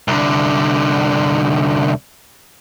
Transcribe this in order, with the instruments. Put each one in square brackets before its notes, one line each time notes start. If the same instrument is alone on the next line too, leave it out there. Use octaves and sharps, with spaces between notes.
[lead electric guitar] C2 D3